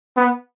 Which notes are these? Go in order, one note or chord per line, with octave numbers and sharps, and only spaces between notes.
B3